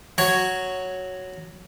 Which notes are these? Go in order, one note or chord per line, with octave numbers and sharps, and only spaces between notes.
F#3 C#5